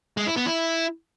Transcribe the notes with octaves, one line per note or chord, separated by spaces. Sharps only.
G#3
E4
B3
E4